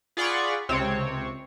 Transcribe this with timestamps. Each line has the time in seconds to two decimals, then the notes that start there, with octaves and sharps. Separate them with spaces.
0.17 F4 G#4 D5 F#5 B5 C#6
0.69 C#2 C3 C4 C#5